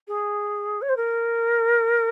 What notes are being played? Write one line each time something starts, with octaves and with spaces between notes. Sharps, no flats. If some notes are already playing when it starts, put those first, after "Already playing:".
G#4
C#5
C5
A#4